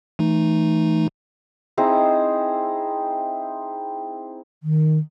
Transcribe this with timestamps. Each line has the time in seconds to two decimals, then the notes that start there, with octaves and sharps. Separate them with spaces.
0.19 E3 A3 D#4
1.77 C4 D#4 E4 G#4
4.63 D#3